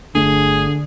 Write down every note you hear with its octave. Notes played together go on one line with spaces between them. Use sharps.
G1 D3 A3 D4 G#4